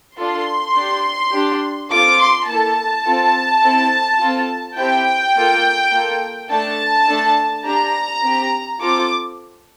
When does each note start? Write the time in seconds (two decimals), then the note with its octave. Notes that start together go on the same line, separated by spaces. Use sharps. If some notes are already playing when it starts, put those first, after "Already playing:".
0.18 D4 F4 A4 C6
0.75 D4 G4
1.33 D4 G4
1.91 C4 F4 A4 D6
2.19 C6
2.48 A#3 E4 A4 A5
3.05 C4 F4 A4
3.63 C4 E4 A4
4.20 C4 F4 A4
4.78 C4 E4 G4 G5
5.36 A#3 F4 A4
5.92 A#3 F4 A4
6.50 A3 D4 A4 A5
7.08 A3 D4 A4
7.65 D4 G4 A#5
8.23 C4 G4
8.80 C4 F4 A4 D6